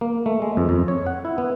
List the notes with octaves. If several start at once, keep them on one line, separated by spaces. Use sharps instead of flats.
A#3
A3
G#3
F2
F2
C#5
F#5
E4
B3